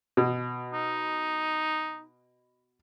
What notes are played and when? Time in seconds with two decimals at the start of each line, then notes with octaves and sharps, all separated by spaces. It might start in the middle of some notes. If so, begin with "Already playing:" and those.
0.17 B2
0.73 D#4